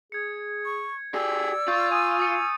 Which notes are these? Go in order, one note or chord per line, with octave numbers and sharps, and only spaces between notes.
G#4 G#6 C#7
C#6
G4 G#4 D5 E6
F4 C#6 G6 A6
G#5 D#6 D#7
D#6 A6 C#7